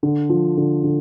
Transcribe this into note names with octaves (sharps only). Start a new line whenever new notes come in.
D3
F3
D3
D3